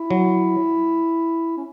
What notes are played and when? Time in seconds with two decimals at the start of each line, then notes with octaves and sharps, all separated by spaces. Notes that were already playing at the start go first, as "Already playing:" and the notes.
Already playing: E4
0.10 F#3
1.57 C#4